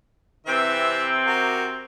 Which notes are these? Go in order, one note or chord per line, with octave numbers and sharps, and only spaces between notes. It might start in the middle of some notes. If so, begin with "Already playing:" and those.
C3 E3 C4 B4 E5
F#4 A#4